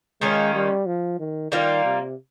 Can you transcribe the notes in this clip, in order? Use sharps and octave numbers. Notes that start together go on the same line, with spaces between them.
D#3 G#3 A#3 C#4 F4
G3
F3
D#3
D#3 G3 A#3 F4
C3